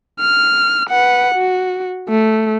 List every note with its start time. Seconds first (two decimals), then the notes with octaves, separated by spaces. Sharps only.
0.20 F6
0.89 B4 F#5
1.35 F#4
2.09 A3